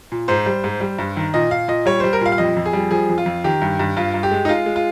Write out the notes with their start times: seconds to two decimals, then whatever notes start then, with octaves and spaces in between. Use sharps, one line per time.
0.12 A#2
0.28 G#2 C5
0.46 G3
0.64 G#2
0.81 G3
0.98 G2
1.17 D#3
1.34 A#2 D#5
1.51 A#2 F5
1.68 A#2 D#5
1.86 G3 C#5
2.00 G3 C5
2.13 A#4
2.21 A#2 F5
2.32 F5
2.38 F2 D#5
2.56 F2
2.66 G#4
2.73 G3
2.91 F3 G#4
3.09 F2
3.18 F4
3.26 F2
3.44 D#3 G4
3.62 G2
3.79 G2
3.97 G2 F4
4.14 G2
4.23 G4
4.31 G#3
4.45 D#4
4.49 G#3 F4
4.66 G#3
4.76 F4